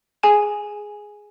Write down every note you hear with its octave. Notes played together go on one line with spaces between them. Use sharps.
G#4 G#5 E7